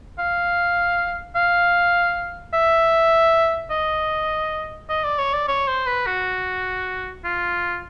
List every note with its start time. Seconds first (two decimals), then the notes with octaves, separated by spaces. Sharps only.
0.19 F5
1.35 F5
2.54 E5
3.70 D#5
4.89 D#5
5.04 D5
5.19 C#5
5.33 D5
5.48 C#5
5.68 C5
5.86 B4
6.06 F#4
7.24 F4